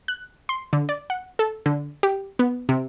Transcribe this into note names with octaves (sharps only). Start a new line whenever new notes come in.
F#6
C6
D3
D5
F#5
A4
D3
G4
B3
C3